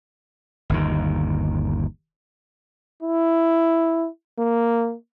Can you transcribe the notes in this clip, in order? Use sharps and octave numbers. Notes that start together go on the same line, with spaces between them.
G1 D#2 D#3
E4
A#3